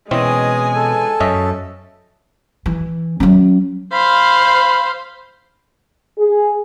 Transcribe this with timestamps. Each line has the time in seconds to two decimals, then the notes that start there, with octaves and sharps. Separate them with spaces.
0.11 B2 E3 G#3 C4 C#4 D#5 G#5
0.75 A4
1.20 F#2 C#4 D#5 E5
2.66 E3
3.20 F#3 C#4
3.93 C5 F5 B5
6.18 G#4